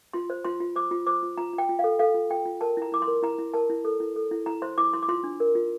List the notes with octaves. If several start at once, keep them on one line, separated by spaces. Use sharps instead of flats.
F4 C6
C5
F4 C6
F4
C5 D6
F4
C5 D6
F4
F4 A#5
F4
G5
F4
A4 F5
A4 F5
F4
F4 G5
F4
A#4 A5
E4 A#5
E4 D6
C6
A#4
E4 A#5
E4
A#4 A5
E4
A4
E4
A4
E4
E4 A#5
C5 C6
E4 D6
E4 C6
D6
F4 C6
D4
A#4
F4